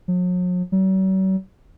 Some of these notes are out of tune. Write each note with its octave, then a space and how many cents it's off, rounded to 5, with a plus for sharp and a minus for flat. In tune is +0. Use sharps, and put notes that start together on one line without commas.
F#3 -45
F#3 +45